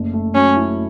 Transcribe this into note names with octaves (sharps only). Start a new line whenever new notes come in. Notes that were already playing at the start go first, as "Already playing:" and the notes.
Already playing: F#1 A3
A3
F#3 C#4
E4